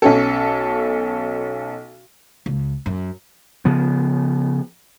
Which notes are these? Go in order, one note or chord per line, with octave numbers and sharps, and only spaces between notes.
B1 C#4 A4
C#2
F#2
C#3 F3 B3